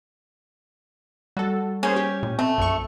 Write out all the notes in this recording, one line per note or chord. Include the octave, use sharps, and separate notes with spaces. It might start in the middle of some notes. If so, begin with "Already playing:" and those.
G3 F#4 A4
A#3 C#4 G#4 C5
G4
A#2
A3 C4
A#1 F#2 C#6